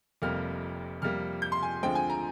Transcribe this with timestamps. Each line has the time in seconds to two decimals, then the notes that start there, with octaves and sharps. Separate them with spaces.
0.22 F1 F2 C3 G3 A#3 F6
1.02 F2 C3 G3 A#3 F6
1.42 G6
1.52 C6
1.63 G#5
1.83 D2 D3 F3 G#3 C4 G5
1.95 G#5
2.10 A#5